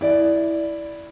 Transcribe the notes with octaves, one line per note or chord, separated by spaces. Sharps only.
E4 D5